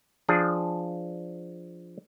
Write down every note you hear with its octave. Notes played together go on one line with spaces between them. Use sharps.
F3 D4 G#4